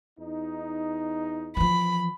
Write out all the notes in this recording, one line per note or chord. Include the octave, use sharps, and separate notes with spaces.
E2 D#4
E3 F3 B5